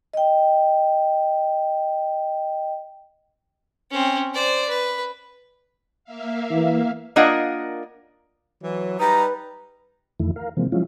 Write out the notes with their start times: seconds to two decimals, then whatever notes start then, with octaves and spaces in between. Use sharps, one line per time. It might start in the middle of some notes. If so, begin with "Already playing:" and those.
0.13 D#5 G5
3.91 C4 C#4
4.34 C5 D5
4.69 B4
6.04 A#3 E5 F5
6.51 E3
7.16 A#3 D4 F4 A#4 D#5 F#5
8.63 E3 F#3
9.00 G3 D#4 B4 A#5
10.20 F2 D#3 E3 A3 E4
10.36 A#4 F5
10.57 C3 E3 F3 G#3 A#3 C4
10.72 F3 F#3 G#3 C#4 E4 F4